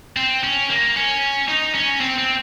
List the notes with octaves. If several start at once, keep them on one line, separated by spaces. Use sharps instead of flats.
C4
C#4
A#3
C#4
D#4
C#4
C4
C4